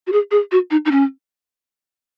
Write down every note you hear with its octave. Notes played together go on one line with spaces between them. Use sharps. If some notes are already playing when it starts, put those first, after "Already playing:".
F#4
G#4
G#4
F#4
D#4
D#4
C#4